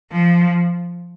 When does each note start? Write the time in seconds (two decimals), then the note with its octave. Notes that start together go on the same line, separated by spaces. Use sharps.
0.12 F3